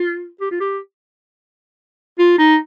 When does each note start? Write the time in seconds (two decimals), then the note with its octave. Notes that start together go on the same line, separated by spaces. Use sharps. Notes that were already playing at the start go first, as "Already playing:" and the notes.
Already playing: F4
0.41 G4
0.51 F4
0.60 G4
2.19 F4
2.39 D#4